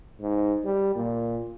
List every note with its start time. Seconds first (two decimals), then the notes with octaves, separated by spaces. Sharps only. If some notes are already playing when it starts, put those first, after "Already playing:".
0.21 G#2
0.65 G3
0.95 A#2